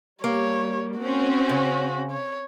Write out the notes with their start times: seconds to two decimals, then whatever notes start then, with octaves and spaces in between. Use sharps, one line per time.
0.24 G3 A#3 C#5
1.00 C4 C#4 F#4
1.49 C#3
2.11 C#5